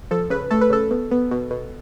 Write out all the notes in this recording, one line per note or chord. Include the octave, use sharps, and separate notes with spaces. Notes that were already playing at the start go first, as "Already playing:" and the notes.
F3 A4
C#3 B4
A3 A4
B4
C#3 A4
B2
B3
B2
B2